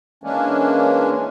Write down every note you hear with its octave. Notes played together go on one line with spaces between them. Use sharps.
E3 G#3 A#3 C#4 D4